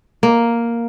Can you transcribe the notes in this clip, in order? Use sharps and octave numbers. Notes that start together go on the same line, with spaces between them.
A#3